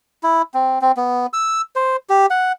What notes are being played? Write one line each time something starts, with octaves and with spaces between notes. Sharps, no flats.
E4
C4
C4
B3
E6
C5
G4
F#5